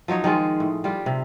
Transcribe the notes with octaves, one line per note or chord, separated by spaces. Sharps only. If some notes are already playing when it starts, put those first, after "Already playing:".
F3 F#3 D#4 C#5
D#3 F3 G#3 F4
A2
G3 F4 G4
C3